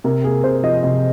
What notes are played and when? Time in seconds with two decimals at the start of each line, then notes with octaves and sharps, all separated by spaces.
0.04 C3 A#4
0.24 A#3 G#4
0.44 C3 C5
0.63 F3 D#5
0.83 C3 D#5